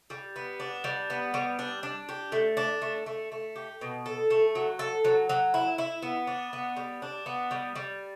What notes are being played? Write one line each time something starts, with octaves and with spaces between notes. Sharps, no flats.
G3
B3
D4
G3
B3
G3
D4
D4
G4
A3
D4
A3
A3
A3
G4
B2
A4
A3
F#3
A4
F#3
F#3
E4
E4
B3
D4
B3
G3
D4
B3
G3
G3